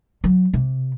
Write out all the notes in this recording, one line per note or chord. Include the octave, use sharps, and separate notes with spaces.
F#3
C3